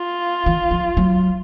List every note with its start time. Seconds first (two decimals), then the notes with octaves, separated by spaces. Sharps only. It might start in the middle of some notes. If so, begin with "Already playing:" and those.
Already playing: F4
0.46 E3
0.71 F3
0.97 F#3